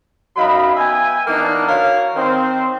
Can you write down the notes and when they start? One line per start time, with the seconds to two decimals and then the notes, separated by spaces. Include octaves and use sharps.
0.37 F#2 F#3 D#4 D#5 F5 B5
0.76 B3 E5 G5 G#5
1.27 E3 A#3 B3 D4 D#4
1.68 F#4 A#4 C#5 F5
2.16 D#3 C4 C5